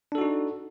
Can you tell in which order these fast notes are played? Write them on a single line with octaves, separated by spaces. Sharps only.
D4 A4 F#4 D#4